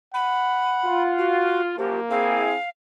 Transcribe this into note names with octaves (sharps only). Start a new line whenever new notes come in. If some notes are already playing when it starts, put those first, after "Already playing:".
F#5 B5
F4
F#4
F#2 F3 A#3 G4
C4 E4 G#4 F5